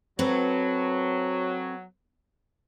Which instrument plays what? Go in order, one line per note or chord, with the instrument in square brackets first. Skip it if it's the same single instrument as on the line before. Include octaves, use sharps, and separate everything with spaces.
[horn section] F#3 [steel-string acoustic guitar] C4 A4 B4